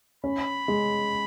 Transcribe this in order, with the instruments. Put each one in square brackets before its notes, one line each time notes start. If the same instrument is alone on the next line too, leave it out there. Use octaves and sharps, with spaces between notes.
[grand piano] C#4 [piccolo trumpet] B5
[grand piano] G#3